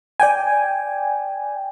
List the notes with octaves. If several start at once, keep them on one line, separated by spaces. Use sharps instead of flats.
D5 G5 G#5